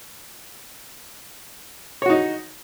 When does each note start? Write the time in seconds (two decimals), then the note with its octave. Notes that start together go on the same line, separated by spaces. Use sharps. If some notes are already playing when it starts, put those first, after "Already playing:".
2.02 C#5
2.06 F#4
2.10 D#4